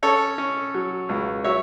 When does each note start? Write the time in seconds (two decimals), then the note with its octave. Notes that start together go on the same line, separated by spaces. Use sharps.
0.03 C#4 A4 C#5
0.38 C#4
0.74 F#3
1.09 C#2
1.44 F#3 C#5 E5